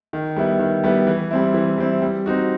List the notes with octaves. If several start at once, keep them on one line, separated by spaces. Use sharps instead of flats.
D#3
G3 B3 E4
D#3
G3 B3 E4
E3
G3 C4 E4
E3
G3 C4 E4
G3
C4 D#4 F#4